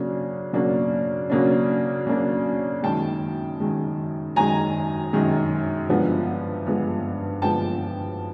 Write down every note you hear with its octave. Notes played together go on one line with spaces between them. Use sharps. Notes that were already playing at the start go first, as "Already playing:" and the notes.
Already playing: C#3 F#3 A#3 D4
C#3 F#3 A#3 D4
C#3 F#3 A#3 D4
C#3 F#3 A#3 D4
F#2 D#3 G#3 G5 A5
F#2 D#3 G#3
F#2 D#3 G#3 G#5 A#5
F#2 D#3 G#3
G2 D3 F3 G#3 B3
G2 D3 F3 G#3 B3
G2 D3 F3 G#3 B3 G5 A5